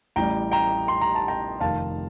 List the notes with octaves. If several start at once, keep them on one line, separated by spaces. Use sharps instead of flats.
A1 A2 G3 G5 A#5
G5 A#5
C6
A#5
A5
G5 A#5
F1 F2 D#3 F5 A5